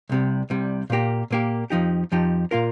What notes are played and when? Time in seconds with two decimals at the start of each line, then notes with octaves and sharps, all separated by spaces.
0.09 C2 C3 G3
0.50 C2 C3 G3
0.90 A#2 A#3 G4 A#4
1.31 A#2 A#3 G4 A#4
1.70 F2 F3 D#4 G4
2.12 F2 F3 D#4 G4
2.51 A#2 A#3 F4 A#4